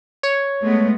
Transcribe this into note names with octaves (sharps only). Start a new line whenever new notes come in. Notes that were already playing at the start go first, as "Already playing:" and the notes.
C#5
G#3 A3 B3